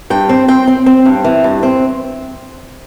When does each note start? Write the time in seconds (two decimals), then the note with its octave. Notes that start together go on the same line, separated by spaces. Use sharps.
0.10 G2 G5
0.29 C4
0.48 C4 G5
0.68 C4
0.86 C4
1.05 G2
1.24 E3
1.44 G2
1.63 C4